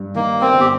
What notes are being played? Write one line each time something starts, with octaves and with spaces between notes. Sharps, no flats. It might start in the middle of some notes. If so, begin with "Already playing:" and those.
Already playing: G2
D#3 A#3
C4
G1
G4